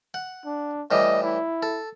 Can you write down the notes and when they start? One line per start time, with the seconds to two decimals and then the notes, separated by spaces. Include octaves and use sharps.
0.14 F#5
0.45 D4
0.91 A2 E3 G3 D#5
1.22 E4
1.63 A4